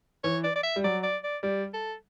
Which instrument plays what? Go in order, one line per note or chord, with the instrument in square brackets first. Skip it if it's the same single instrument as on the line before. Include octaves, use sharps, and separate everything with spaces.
[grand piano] E3 [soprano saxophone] C#5
[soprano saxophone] D5
D5
E5
[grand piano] G3
[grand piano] F#3 [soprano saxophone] D5
[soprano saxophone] D5
D5
[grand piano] G3 [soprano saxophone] D5
[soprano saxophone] A4